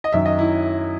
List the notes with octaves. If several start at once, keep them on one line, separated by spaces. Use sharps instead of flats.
D#5
F#2 D#3 F#3 E5
D#5
E4